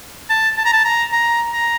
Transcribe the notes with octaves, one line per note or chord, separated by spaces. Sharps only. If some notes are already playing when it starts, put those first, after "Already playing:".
A5
A5
A#5
A5
A#5
A#5
A#5